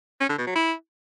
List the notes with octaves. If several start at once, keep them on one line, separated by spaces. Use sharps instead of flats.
C#4
D3
B2
F#3
E4